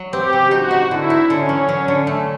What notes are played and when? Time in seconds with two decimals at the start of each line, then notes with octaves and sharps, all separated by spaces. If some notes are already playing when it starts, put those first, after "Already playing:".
Already playing: F#3
0.13 C4 G4
0.33 C#3
0.51 D#4 F#4
0.71 D#4
0.91 D3 E4
1.10 D#4
1.29 D3 C#4
1.49 F#3
1.69 F#3
1.88 D3
2.07 A3